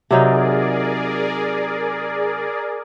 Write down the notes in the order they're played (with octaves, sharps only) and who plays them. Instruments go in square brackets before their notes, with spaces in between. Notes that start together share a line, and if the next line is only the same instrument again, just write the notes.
[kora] C3 F#3 D#4 [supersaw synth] G#4 A#4 D5